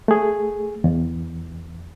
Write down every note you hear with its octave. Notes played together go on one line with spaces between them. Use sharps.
A3 G#4
E2